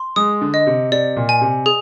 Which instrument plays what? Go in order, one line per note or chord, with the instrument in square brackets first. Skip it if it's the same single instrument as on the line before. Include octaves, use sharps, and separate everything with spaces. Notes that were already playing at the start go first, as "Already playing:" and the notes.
Already playing: [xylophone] C6
[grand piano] G#3 [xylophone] D#6
[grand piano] D3
[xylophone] D#5
[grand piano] C3
[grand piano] C3 [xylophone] D5
[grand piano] A#2
[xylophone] G#5
[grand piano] C3
[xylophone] G#4